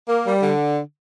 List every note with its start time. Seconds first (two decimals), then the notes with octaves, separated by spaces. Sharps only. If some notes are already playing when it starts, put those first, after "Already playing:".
0.08 A#3
0.26 G3
0.42 D3